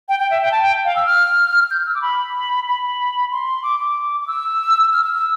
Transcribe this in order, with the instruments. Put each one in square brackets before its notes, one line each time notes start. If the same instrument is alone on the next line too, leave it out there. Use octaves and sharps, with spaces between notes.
[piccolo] G5
G5
E5
G5
A5
G5
F5
E6
F6
G6
E6
D6
B5
B5
C6
D6
D6
D6
E6
F6
E6
E6